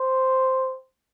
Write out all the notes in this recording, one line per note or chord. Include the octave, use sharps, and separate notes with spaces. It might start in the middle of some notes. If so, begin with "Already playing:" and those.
Already playing: C5